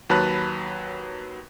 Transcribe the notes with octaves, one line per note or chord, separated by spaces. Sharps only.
D#2 F#3 B4 A5 B5 F#6